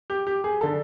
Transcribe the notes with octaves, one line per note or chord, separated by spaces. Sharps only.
G4
G4
G#4
D3 A4